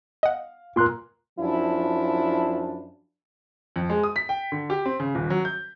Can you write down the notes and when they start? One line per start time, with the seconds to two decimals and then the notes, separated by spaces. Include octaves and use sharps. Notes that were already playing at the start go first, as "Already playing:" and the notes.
0.23 D#5 F5 F#5
0.76 A#2 F4 A#4 C6 F#6
1.40 F#2 F3 D4 E4
3.76 F2
3.90 G#3
4.03 D#6
4.16 B6
4.29 G5
4.52 D3
4.70 G4
4.86 C4
5.00 C#3
5.15 D#1
5.30 F#3
5.45 G6